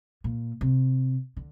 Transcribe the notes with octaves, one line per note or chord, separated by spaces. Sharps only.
A#2
C3
D3